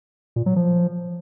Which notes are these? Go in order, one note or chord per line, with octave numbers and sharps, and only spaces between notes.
A#2
F#3
F3